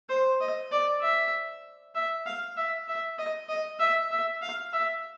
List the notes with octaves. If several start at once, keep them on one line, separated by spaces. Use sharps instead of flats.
C5
D#5
D5
E5
E5
F5
E5
E5
D#5
D#5
E5
E5
F5
E5